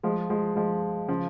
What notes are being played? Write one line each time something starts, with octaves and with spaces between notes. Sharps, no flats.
F3 G#3
F3 G#3
F3 G#3
C#3 F3